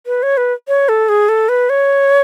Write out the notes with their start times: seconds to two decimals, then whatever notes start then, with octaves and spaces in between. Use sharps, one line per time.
0.06 B4
0.23 C#5
0.37 B4
0.68 C#5
0.89 A4
1.09 G#4
1.29 A4
1.49 B4
1.70 C#5